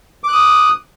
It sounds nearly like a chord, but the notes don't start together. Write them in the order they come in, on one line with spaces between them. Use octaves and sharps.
D6 F#6 D#6